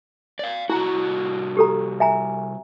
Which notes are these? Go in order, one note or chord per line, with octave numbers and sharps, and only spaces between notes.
D5 F5
C2 E4 F#4 A#5
G4 A4 A#5
E5 G#5 A#5